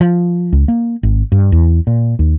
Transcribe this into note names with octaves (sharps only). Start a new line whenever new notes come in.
F3
C#2
A#3
G#1
G2
E2
A#2
D#2